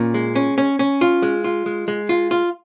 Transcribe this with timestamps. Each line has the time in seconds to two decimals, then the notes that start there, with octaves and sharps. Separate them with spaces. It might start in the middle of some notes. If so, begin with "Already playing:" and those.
Already playing: A#2 C#4
0.14 G#3
0.36 C#4
0.58 C#4
0.79 C#4
1.01 F4
1.22 G#3
1.44 F4
1.66 G#3
1.88 G#3
2.09 F4
2.31 F4